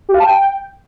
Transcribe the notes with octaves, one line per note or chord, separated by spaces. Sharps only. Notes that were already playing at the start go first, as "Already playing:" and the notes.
G4
F5
A5
G5